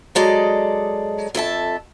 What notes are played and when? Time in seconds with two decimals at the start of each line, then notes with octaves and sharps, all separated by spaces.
0.15 F#3 G#3 A4 D5 D#5
1.35 F2 A4 E5 A5